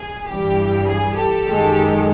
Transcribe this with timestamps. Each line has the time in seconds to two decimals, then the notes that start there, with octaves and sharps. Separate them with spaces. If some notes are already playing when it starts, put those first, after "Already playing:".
Already playing: G#4
0.27 G2 E3 G3 G4
0.87 G#4
1.15 G4 A4
1.45 F#2 D#3 G#3